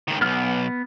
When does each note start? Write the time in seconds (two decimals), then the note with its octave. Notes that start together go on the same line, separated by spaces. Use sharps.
0.08 C#2 D#3
0.21 B1 G#2 B3 F6